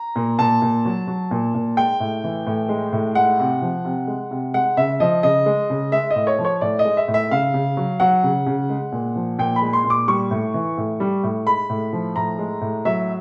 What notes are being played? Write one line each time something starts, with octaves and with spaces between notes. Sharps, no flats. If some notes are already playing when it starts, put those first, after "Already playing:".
Already playing: A#5
A#2
A#2 A5
A#2
F#3
F#3
A#2
A#2
G#3 G5
A2
E3
A2
G#3
A2
G#3 F#5
C3
F3
C3
G#3
C3
G#3 F#5
C#3 E5
F3 D#5
C#3 D#5
G#3
C#3
G#3 E5
D#5
A2
C#5
F3
C#5
A2 D5
D#5
G#3
E5
A2
E5
C#3 F5
C#3
F#3
F#3 F#5
C#3
C#3
G#3
A#2
F3
A#2 G5
B5
G#3
C6
A#2
D6
G3 C#6
A2
E3
A2
G3
A2
G#3 B5
A2
F3
A2 A#5
G#3
A2
F#3 E5